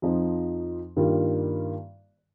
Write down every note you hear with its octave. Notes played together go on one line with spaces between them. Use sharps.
F2 F3 D#4
G2 D#3 G3 A#3 F4